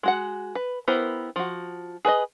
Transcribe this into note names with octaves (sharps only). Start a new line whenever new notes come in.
G#3 F#4 F#5
B4
B3 E4 G4 A#4 C5
F3 F#4
G#4 B4 C#5 D#5